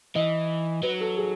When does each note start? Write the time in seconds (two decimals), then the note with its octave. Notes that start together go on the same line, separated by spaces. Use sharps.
0.15 E3 D#5
0.83 F#3 B4
1.01 A4
1.17 G#4